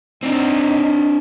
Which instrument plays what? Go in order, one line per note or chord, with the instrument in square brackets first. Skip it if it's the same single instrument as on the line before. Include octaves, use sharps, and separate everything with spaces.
[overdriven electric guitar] C4 D4 [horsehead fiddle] D#4